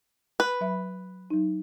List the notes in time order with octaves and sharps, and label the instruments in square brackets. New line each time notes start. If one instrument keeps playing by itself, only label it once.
[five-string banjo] B4
[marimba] F#3 E5 B5
F#3 D#4